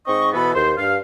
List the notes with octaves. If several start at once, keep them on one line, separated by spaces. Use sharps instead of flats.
G#2 C4 D#5 C#6
B2 E3 B3 A4 B5
D#2 C5
G2 F5